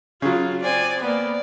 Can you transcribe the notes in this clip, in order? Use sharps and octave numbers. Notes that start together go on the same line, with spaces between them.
C#3 F#3 F4
C4 D5 G#5
A#3 B3 D5